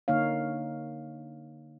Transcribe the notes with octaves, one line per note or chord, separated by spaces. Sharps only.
D3 A#3 D#4 C#5 F5